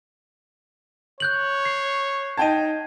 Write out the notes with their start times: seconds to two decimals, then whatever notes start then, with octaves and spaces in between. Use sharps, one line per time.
1.20 C#5 F#6 G6 F#7
1.65 C7
2.37 D#4 G5 A5 G#6 D#7